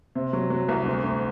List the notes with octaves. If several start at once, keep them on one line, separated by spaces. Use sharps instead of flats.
C3
F#3
F#3
C2
D2
D2